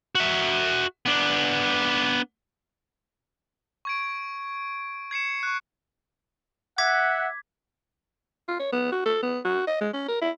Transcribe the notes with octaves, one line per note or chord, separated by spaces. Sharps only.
F#4 E5
B3 D4
C#6 G#6 D7
G#6 C7 C#7 E7
C#6 F#6
E5 F#5 D6 G#6 B6
F4
C#5
B3
F#4
A4
B3
F#4
D#5
G#3
C#4
A#4
E4